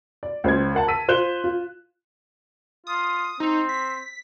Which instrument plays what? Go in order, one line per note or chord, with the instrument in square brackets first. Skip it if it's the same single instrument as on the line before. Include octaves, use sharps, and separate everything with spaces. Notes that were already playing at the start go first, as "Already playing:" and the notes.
[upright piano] D5
C#2 C5 G#6
A#4 F#5 A5
A5 E6 B6 D#7
F4 C5 F#6 E7 G7
F4
[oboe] F4 [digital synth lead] D#6
[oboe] C4 [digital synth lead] D#4
[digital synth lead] B6